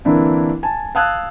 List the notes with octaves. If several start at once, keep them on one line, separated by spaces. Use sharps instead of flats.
D3 E3 A#3 C4 D4 E4
G#5 A5
F5 A5 D#6 E6 F#6 G#6